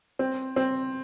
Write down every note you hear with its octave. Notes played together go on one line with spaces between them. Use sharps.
C4
C4